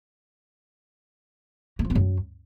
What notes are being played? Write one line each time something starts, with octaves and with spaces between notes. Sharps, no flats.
A#3
F3
B3
F#2